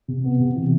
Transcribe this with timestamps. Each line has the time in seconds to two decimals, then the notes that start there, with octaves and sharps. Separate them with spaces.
0.08 C3
0.24 B3
0.40 C3
0.56 E3